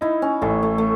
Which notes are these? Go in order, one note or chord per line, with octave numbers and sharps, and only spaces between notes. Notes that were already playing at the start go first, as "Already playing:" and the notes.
D#4 E4
C#4
A1 A3
A3
A3